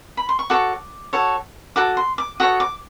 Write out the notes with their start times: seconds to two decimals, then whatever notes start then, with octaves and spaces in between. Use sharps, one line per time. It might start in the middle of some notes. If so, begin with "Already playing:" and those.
0.17 B5
0.29 C6
0.39 C#6
0.50 F#4 A4 C#5 D6
1.13 F#4 A4 C#5
1.76 F#4 A4 D6
1.97 C6
2.18 D6
2.40 F#4 A4 C#5 D#6
2.60 D6